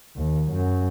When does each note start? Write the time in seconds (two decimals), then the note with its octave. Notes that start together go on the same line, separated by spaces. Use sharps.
0.17 D#2
0.51 F#2